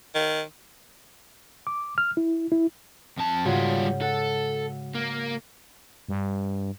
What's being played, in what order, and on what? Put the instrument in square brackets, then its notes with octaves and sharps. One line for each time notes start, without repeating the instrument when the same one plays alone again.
[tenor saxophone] D#3
[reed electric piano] D6
F6
E4
E4
[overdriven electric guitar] F2 A5
[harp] G#2 C#3 F#4 [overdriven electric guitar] G3 F4
[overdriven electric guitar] A4 [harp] F#5
[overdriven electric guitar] A#3
[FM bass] G2